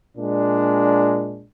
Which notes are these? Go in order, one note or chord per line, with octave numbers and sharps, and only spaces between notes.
A#2 G#3 D4